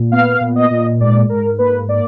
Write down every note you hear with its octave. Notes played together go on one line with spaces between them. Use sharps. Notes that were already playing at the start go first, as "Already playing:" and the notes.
Already playing: A#2
B3 F5
A#2
D#5
A#2
G#2 D5
G#2 A#4
A#3 B4
A#3 D5